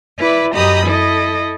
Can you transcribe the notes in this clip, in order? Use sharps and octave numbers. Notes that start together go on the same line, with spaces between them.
E4 B4 D5 E5
F#2 G4 D#5 A#5 B5 D#6
E4 A4 D#5